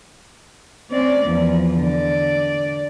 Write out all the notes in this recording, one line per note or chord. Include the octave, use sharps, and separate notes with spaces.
C4 C#4 D5
E2 F3
D3 D5